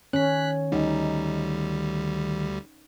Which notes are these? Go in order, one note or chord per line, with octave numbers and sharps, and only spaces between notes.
D#3 C#4 F#6 B6
D2 G3 D#4